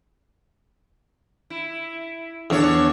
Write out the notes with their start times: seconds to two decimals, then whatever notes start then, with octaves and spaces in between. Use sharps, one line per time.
1.50 E4
2.50 E2 D4 C#5